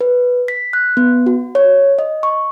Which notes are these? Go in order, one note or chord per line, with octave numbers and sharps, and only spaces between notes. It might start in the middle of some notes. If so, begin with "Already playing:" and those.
B4
B6
F#6
B3
F#4
C#5
D#5
C#6